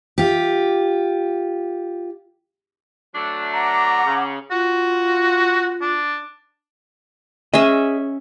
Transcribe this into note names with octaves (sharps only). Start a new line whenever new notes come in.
F4 G4
F#3 A3 D4
F#5 A#5 D6
C#3
F4 F#4
D4
C#4 G#4 D#5 E5